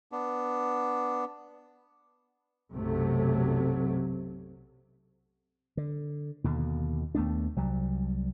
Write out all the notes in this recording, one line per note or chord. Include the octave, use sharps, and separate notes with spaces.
B3 D4
B1 F#2 C3 F#3 A3
D3
D#2 B2 D3
D#2 A3 B3 D4
C2 F#3 G3